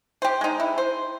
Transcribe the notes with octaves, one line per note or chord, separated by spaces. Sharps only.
G4 C5
G#3 D#4
E4
C5